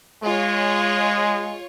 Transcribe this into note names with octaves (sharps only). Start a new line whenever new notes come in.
G#3 F4 C#5